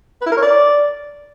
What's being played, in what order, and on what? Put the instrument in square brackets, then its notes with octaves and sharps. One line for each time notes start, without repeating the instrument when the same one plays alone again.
[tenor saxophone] B4
E4
A#4
C#5
D5